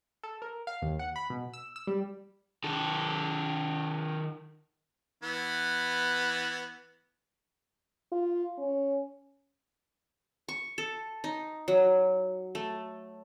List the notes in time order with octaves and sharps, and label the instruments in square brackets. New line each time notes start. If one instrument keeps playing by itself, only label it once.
[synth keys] A4
A#4
F5
D#2
F#5
B5
B2
E6
E6
G3
[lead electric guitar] D#3 A4
[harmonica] E3 B3
[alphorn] F4
C#4
[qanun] C#6
A4
D#4
F#3
A3